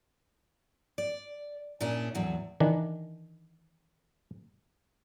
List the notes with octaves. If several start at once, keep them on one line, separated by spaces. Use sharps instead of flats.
D5
A#2 C#4 D4 E4 G#4
E2 A2 F#3
D#3 E3 D4